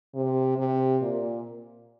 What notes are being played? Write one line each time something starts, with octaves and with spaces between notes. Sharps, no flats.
C3
C3
A#2